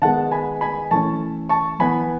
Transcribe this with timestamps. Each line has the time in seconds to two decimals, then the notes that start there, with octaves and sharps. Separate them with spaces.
0.02 D#3 G#3 B3 F#5 A5
0.31 G#5 B5
0.61 G#5 B5
0.91 E3 A3 C#4 A5 C#6
1.49 A5 C#6
1.79 E3 B3 G#5 B5